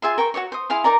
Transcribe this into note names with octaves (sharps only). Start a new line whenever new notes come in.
F4 G#4 E5 C6
A#4 G5 C#6
F#4 C5 C#5 C#6
C5 D#6
E4 G#4 F5 C6
D#4 A#4 D5 A#5